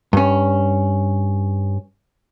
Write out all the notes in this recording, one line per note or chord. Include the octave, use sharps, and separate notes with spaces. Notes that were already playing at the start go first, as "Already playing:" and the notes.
G2 C#4